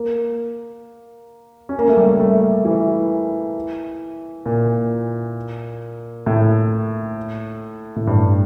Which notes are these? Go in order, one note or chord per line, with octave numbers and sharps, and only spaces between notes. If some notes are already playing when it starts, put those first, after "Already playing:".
Already playing: A#3
C#4
A#3
A3
G3
A#3
A3
E3
A#2
A2
A2
G2